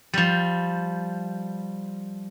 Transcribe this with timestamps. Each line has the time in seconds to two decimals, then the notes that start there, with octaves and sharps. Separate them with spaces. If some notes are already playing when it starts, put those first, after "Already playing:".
0.14 F3 G3